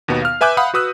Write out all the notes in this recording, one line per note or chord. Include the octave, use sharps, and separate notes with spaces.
D#2 B2 B3 D#4
F5 F6
B4 E5 G#5 D6 F#6 G6
F5 F#5 B5 D#6
F#4 B4 D#6 E6 F#6